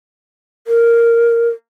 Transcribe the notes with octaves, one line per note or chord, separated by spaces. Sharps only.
A#4